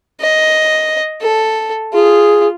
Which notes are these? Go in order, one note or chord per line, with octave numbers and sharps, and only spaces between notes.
D#5
A4
F4 G#4